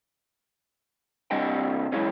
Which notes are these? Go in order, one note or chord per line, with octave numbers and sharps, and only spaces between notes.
C3 G3 D4 D#5 F#5 G5
F#2 E3 G#3 C#4